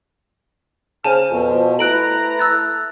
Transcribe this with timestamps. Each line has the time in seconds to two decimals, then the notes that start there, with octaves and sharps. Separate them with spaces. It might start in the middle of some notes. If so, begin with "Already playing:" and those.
1.04 C#3 C5 G#5 A5 F6
1.31 F2 B2
1.50 F3
1.79 A3 E4 B4 A#5 F#6 D7 F#7
2.39 E6 F#6 A6